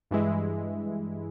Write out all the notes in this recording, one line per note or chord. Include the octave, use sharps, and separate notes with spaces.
G2 E3 G#3 E4